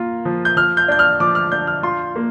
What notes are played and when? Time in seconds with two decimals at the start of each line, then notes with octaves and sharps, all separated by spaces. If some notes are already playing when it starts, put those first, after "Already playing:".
Already playing: A#3 F4
0.25 F3
0.45 G6
0.57 F3 F6
0.77 G6
0.88 D4 G6
0.99 F6
1.20 F3 D6
1.35 F6
1.52 D4 G6
1.67 F6
1.83 F4 C6
2.16 A#3